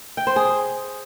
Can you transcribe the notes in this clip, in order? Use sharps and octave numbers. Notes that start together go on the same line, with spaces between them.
G5
C5
G#4